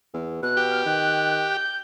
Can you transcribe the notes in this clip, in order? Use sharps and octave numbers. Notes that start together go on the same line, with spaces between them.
E2
B2 F#6
G4
F6
D#3 F#6
G6